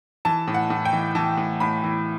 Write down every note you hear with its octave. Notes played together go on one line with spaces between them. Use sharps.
E3 A5
A2
F#5
A2
G5
E3
E3 A5
A2
A2 B5
E3